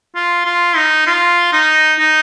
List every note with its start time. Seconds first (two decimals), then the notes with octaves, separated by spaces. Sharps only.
0.15 F4
0.45 F4
0.76 D#4
1.06 F4
1.52 D#4
1.99 D#4